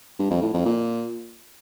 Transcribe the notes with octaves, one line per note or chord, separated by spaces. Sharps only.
G2
F2
A2
F2
A#2